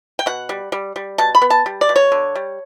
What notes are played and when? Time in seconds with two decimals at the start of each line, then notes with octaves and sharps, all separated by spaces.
0.19 G5
0.26 B2 F#5
0.49 G3
0.72 G3
0.96 G3
1.18 B2 A5
1.35 B5
1.42 B3
1.50 A5
1.66 G3
1.81 D5
1.89 B2
1.96 C#5
2.12 D3
2.35 G3